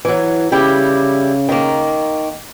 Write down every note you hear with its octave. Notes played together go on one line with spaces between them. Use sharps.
E3 F#3
C#3 G3 E4 G4
D#3 A#3